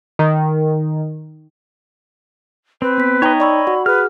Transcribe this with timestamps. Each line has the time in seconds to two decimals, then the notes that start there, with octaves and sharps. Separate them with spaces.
0.19 D#3
2.82 C4 B4
2.98 B3 B6
3.22 D#4 C#5 D#5 G5 A#5
3.40 D5 B5 C#6 E6
3.67 F#4 F#5
3.86 G#4 B4 F6